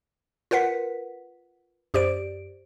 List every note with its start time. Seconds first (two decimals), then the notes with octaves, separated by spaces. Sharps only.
0.51 F4 A#4 B4 F#5 B6
1.94 F#2 G4 C5 D5 D7